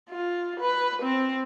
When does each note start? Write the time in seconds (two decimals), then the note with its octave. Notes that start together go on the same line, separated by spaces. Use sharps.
0.10 F4
0.60 B4
1.03 C4